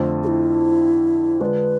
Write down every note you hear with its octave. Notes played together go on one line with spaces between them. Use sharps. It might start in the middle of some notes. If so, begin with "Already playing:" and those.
Already playing: F2 D3 A3 C4 F4
G#4
E4
D3 G#3 D4 F4 B4 C5